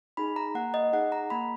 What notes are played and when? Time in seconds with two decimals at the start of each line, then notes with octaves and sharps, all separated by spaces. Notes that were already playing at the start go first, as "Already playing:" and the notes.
0.17 D#4 G#4 B5
0.36 A#5
0.55 A#3 F#5
0.74 D#5
0.93 D#4 G#4 F#5
1.12 A#5
1.30 A#3 B5